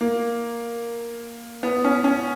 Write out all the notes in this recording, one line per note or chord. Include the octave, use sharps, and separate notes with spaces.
A#3
B3
C#4
C#4